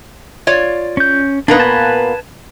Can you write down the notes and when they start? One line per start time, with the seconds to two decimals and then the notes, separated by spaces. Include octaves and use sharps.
0.47 F4 C#5 D5
0.97 C#4 G6
1.48 A#2 A#3 B3 D4 D#4
1.60 B4 G#5 A5